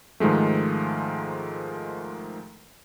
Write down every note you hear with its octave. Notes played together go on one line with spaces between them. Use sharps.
G#2 D#3 F3 G#3 A3